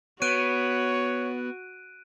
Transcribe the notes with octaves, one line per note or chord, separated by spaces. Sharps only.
B3 F#4 C#5 F#6 D7 D#7